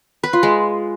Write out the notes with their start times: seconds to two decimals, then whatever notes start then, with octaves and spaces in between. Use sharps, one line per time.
0.23 B4
0.33 F4
0.43 G#3